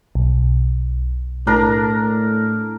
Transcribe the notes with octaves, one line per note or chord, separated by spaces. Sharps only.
B1
A2 D4 A#4 A#5